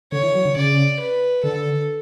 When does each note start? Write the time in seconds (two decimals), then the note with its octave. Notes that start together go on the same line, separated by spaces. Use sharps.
0.12 D3 C#5
0.23 E3
0.34 F#3
0.45 D3
0.56 C#3 D5
1.00 B4
1.44 D3 A4